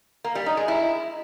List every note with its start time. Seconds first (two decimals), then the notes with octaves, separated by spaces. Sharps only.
0.24 A#3
0.35 G3
0.46 D#4
0.57 G#3
0.68 E4